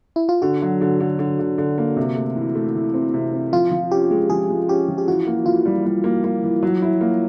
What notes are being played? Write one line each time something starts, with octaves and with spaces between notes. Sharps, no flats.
E4
F4
D3 F#4
F#3
D3
D3
D3
D3
D3
A#3
C3
A3
E3
A3
E3
C4
C3
C4
F3 F4
F3
C#4 G4
G#3
F3 G#4
G#3
C#4 G4
F3
G4
E3 F#4
A#3
E3 F4
G3
G3
A#3
A#3
E3
F#3
E4
A#3